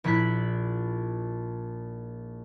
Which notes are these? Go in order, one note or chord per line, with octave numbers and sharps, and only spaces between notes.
A#1 A#2 E4 B5 F#6 B6